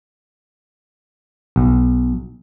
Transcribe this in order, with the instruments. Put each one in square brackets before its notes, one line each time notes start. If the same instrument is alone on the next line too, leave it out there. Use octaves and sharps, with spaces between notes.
[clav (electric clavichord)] B1